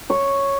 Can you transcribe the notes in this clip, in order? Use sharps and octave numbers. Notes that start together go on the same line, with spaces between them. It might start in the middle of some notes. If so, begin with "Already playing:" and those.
C#5